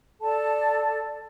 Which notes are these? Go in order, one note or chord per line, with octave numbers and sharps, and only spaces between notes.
A4 D5 A5